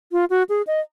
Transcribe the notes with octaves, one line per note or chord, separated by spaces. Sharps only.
F4
F#4
G#4
D#5